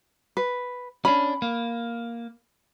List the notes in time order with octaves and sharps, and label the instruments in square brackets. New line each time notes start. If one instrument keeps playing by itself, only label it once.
[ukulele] B4
[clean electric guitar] C#4 D4 [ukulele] B5
[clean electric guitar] A#3